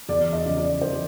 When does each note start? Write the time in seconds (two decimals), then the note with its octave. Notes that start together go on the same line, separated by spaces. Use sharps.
0.09 E2 D5
0.33 D#5
0.46 C#3 F3
0.58 D5
0.82 E2 C5